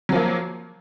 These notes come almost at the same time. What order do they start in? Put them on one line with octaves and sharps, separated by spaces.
F#3 F3 A#3